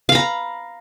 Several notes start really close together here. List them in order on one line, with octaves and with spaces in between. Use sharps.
F5 B5 A#5